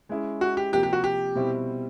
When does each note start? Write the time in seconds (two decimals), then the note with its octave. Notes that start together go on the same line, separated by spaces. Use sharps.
0.09 G#3 C#4 E4 G#4
0.41 F#4
0.57 G4
0.72 C3 F3 A#3 G4
0.83 G4
0.93 F#4
1.04 G4
1.35 B2 G3 C4 E4